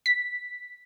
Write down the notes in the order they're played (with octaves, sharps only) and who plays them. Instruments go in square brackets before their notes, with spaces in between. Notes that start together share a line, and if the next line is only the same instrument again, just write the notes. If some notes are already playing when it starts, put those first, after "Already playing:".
[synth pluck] B6